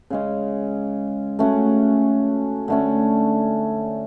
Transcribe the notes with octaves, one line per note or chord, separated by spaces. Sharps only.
C#3 G#3 C#4
A3 C#4 F#4
D3 A3 C#4